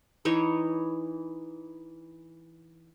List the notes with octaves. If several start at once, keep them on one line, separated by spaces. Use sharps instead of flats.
E3 D#4 C#5